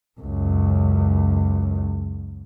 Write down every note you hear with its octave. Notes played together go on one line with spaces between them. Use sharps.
C#2 F#2